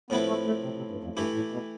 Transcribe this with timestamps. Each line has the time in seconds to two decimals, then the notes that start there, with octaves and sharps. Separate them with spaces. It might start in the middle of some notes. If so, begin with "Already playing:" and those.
0.10 A2 F3 B3 C4 E4 B4
0.28 A3
0.46 A3
0.64 C3
0.77 C3
0.91 G2
1.04 F2
1.17 G2 E3 A3 E4 G4
1.35 A2
1.52 B2